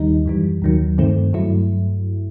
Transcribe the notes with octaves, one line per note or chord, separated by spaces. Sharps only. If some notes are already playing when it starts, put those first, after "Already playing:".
Already playing: D#2 D#3 G3 D#4
F#2 E3 G3
D#2 D#3 F#3
G2 D#3 A3 C4
G2 F#3 A3 E4